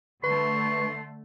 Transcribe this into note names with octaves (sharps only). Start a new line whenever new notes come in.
D3 A3 B4 C6 C#6